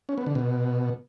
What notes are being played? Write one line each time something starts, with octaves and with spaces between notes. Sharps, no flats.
C#4
B3
D3
B2